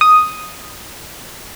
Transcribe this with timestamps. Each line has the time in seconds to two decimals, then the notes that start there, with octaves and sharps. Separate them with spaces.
0.01 D#6